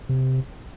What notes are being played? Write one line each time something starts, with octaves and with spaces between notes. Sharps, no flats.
C3